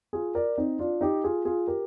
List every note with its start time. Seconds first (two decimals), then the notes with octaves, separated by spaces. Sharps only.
0.13 F4 G#4
0.35 A#4 D5
0.58 C4 D#4
0.79 D4 F4
1.01 D#4 G4
1.24 F4 G#4
1.45 F4 G#4
1.68 G4 A#4